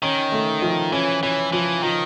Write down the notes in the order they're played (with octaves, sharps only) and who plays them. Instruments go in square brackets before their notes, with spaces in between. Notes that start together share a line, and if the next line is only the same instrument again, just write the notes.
[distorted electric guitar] D#3 [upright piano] C#4
[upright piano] A3
F3
[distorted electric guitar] E3 [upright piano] C#4
[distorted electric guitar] E3 [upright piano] C#4
[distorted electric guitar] E3 [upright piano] F3
[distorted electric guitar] D#3 [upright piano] F3